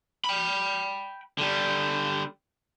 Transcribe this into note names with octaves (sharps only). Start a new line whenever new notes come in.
G5 B5
D3 G3